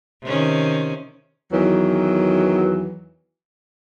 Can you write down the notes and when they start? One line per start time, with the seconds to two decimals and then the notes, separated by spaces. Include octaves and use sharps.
0.23 C3 D#3 C#4
1.52 E2 D#3 E3 F#3